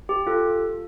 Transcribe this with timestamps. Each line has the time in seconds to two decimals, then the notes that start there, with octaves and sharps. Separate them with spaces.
0.09 G4
0.27 F4 A4